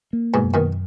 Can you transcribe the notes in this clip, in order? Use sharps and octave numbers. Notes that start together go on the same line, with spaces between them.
A#3
G#2 B2
F#2
B2 D#3